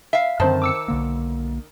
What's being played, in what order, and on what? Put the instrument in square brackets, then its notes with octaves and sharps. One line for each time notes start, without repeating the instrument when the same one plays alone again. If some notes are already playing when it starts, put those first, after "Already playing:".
[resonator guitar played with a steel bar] E5 F5
[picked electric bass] F#2 D3 C4 [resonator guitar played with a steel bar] D#3 [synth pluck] C5 A5
[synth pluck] D6 E6 C#7
[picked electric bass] B1 D3 A#3